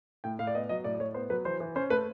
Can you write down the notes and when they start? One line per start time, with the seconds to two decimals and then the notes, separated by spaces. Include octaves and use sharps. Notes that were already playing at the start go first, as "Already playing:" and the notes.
0.24 A2 G5
0.39 A2 F5
0.47 D5
0.55 B3 D#5
0.69 F#3 D#5
0.84 A2 D5
0.94 D5
1.00 A2 C#5
1.14 B3 C5
1.30 F#3 B4
1.45 E3 C5
1.60 E3
1.76 C#4 C5
1.90 A3 B4